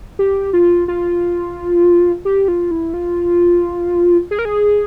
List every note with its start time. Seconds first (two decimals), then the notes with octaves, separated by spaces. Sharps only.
0.19 G4
0.53 F4
0.88 F4
2.25 G4
2.48 F4
2.71 E4
2.94 F4
4.31 G#4
4.39 A#4
4.45 G#4